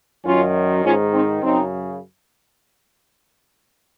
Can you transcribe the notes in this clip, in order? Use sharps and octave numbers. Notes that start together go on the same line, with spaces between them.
F#2 D#3 C#4 F4
G#2 D#3 C#4 F4
C4 D#4
F#2 C#3 C4 D#4